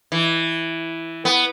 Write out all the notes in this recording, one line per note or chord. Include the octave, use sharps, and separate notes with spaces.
E3
B3